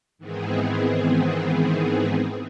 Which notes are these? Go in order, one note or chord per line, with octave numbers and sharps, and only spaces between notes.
G#2 D#3 E3 B3 C4 G#4